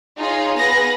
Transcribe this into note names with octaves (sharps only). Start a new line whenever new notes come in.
D#4 F4 G#4 C#5
B3 G#4 B4 F5 A#6